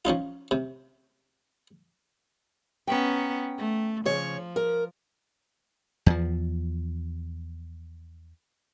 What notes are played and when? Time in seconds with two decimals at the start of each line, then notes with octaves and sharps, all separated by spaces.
0.05 F3 C#4 D#4 F4
0.51 C3
2.87 B3 C#4 G5 A#5
3.58 A3
4.06 C#3 F3 C#5
4.56 A#4
6.06 E2 F3